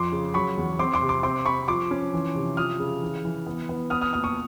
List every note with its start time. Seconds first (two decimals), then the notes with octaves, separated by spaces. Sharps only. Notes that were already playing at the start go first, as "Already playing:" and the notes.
Already playing: F2 C6 D6
0.12 C#3
0.34 F#3 B5 C#6
0.57 E2
0.79 C4 C6 D6
0.94 C6 D6
1.02 C3
1.09 C6 D6
1.23 C4 C6 D6
1.45 C4 B5 C#6
1.68 F3 C6 D6
1.91 C#4
2.13 E3
2.35 C3
2.57 F3 D#6 F6
2.79 C#3
3.02 E3
3.25 E3
3.46 B3
3.69 B3
3.90 B3 D#6 F6
4.01 D#6 F6
4.13 A#2 D#6 F6
4.24 C#6 D#6